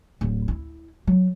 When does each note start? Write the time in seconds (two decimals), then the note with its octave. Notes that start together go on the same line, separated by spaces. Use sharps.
0.21 D1
0.48 E4
1.07 F#3